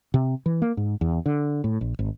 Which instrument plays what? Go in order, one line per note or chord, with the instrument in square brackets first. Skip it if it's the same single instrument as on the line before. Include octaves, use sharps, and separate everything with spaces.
[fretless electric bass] C3
E3
A#3
G#2
E2
D3
A2
A#1
G#1